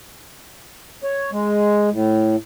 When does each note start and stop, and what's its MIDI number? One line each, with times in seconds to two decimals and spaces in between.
1.03 1.30 73
1.32 1.90 56
1.92 2.36 45